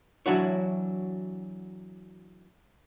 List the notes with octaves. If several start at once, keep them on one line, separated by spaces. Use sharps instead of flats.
E3 F#3 D4 E4 F#4 C#5